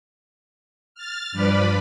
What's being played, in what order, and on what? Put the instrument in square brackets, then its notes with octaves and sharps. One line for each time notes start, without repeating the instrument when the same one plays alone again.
[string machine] F6 A6
G2 F3 B4 D5 B5